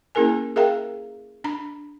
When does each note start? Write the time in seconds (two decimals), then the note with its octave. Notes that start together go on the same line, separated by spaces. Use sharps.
0.15 A#3 C#4 E4 G#4 A#4 G#5
0.56 G#4 A#4 E5 F5 G5 A#5
1.44 D4 A#5